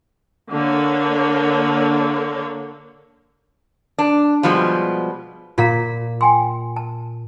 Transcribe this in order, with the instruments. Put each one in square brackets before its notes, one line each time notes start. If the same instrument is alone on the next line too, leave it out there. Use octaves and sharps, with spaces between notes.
[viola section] D3 A#3 D4 C#5
[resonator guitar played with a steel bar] D4
B2 F3 G3 G#3
[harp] A#2 B6 [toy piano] F4 F5 A#5
[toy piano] G5 G#5 C6
A5